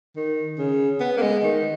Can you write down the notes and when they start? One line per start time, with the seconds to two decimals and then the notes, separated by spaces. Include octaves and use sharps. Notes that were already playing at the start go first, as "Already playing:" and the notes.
0.16 D#3
0.59 C#3
1.00 B3
1.17 A#3
1.22 G#3
1.44 D#3